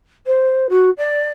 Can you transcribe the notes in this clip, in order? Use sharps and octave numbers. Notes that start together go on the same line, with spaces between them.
C5
F#4
D5